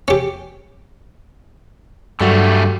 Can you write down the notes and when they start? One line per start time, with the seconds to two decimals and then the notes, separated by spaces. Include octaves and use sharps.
0.08 C#4 G4
2.21 G2 D3 F#3 G3 A3 F#4 A4